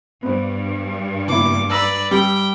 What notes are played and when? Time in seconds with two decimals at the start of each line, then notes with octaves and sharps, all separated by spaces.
0.23 G2 B3 C5
1.28 F#1 B3 E4 D6
1.70 B4 D5 A#5 E6 A#6
2.11 G3 G5